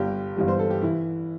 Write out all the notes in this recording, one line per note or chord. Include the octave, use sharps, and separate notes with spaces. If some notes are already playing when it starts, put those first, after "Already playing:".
Already playing: G1 G2 G3 G4
G1 G2 E3 G3
C5
A4
G4
E3 E4